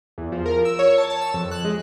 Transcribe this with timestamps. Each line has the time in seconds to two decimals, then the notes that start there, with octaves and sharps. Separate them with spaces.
0.18 E2
0.32 F3
0.46 A#4
0.65 E6
0.79 C#5
0.98 A5
1.10 A5
1.21 E6
1.34 F2
1.51 F#6
1.65 G#3